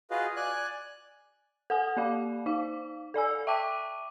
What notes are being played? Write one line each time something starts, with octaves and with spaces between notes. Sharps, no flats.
F4 F#4 G#4 B4 D#5 F5
D5 G#5 F#6
A4 F#5 G#5
A#3 D5 F5
D#4 F5
A4 D5 G#5 E6
E5 G5 A5 D6 D#7